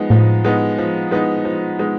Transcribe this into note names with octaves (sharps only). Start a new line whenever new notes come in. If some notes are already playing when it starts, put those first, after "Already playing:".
Already playing: F3 G#3 B3 D#4
A2 F3
G#3 B3 D#4
F3
G#3 B3 D#4
F3
G#3 B3 D#4